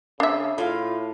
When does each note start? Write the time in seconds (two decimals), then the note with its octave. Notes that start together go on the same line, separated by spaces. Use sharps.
0.20 C#3 D4 E5
0.58 A2 F4 F5